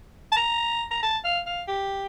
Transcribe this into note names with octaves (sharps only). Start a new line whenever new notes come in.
A5
A#5
A#5
A5
F5
F5
G4